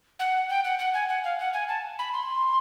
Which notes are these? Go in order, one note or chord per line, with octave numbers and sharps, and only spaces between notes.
F#5
G5
F#5
F#5
G#5
F#5
F5
F#5
G#5
A5
B5
C6